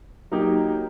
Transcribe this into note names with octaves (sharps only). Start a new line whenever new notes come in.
F#3 A#3 D#4 G4